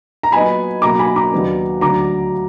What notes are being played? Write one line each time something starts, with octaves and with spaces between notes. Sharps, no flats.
A#5
A#2 F#3 B3 D#4 G#5 B5
B2 F#3 A#3 A#5 D6
G#5 B5
A#5 D6
D#2 D#3 F#3 B3 D4
D2 D3 F#3 A#5 D6